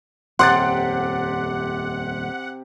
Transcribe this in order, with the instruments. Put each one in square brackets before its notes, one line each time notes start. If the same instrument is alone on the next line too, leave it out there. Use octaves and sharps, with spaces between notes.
[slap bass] D#1 F2 [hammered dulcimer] C3 G4 [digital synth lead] F#5 [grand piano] C6 F#6 A6